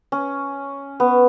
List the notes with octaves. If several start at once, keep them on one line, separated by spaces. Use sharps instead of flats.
C#4
B3